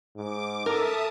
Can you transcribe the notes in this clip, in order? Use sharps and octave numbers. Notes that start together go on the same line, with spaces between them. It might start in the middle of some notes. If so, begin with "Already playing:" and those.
G#2 D6
A4 A#4 E5 A5 D#6